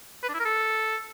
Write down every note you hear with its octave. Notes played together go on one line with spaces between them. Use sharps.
B4
D4
E4
A#4
A4